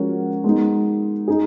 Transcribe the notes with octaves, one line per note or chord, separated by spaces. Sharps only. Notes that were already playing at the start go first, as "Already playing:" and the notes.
Already playing: F3 G#3 C#4 F#4 A#4
G#3 B3 D#4
D#4 G#4